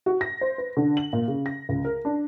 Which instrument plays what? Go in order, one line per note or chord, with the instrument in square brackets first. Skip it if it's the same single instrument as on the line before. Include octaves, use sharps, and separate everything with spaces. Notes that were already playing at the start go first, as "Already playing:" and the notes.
[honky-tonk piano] F#4
A#6
C5
B4
D3
F#7
A#2
C#3
A#6
C#2
A#4
D4